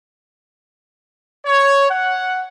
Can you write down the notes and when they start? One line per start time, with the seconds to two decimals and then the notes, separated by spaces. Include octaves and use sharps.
1.46 C#5
1.90 F#5